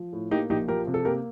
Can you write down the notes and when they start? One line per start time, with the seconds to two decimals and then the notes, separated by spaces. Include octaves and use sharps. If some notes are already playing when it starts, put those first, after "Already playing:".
Already playing: F3
0.13 A2
0.31 A#3 D#4 G4
0.50 A#1 D#4 G4
0.68 F3 G4 A#4
0.87 C3
0.94 A4
1.05 A#3 G4 A#4